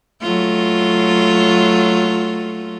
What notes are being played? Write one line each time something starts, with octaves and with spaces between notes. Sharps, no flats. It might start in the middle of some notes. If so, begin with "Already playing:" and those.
F#3 A3 F4